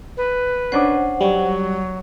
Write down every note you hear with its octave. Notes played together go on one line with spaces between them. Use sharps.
B4
C#4 D4 C5 F#5 D6
F#3 G3